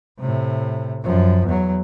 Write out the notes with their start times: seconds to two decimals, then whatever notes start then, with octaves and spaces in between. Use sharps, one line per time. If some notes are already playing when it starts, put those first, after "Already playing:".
0.20 A2 C3
1.03 F#2 F3
1.46 E2 F#3